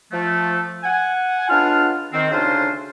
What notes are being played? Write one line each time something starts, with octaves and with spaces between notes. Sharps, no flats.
F3 A3
F#5 G#5
C#2 B3 D4 F4 F5 F6
D#3 C4
D2 C#3 D4 D#4 F4 C5